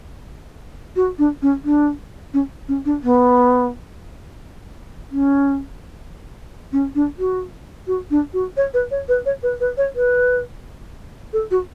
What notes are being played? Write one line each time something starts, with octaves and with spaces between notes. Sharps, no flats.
F#4
D4
C#4
D4
C#4
C#4
D4
B3
C#4
C#4
D4
F#4
F#4
D4
F#4
C#5
B4
C#5
B4
C#5
B4
B4
C#5
B4
A4
F#4